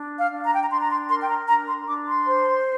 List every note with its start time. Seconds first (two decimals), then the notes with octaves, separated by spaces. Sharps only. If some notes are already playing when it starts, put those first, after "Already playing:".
Already playing: D4
0.18 F5
0.32 D4
0.44 A#5
0.53 G5
0.62 A#5
0.71 D4 C6
0.80 A#5
0.90 C6
1.09 A#4 C6
1.22 G5
1.29 A#5
1.48 D4 A#5
1.68 C6
1.87 D4 D6
2.07 C6
2.26 C5